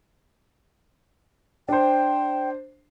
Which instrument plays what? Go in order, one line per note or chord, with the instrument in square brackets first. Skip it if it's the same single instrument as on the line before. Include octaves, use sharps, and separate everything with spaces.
[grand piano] D4 C5 [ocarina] G5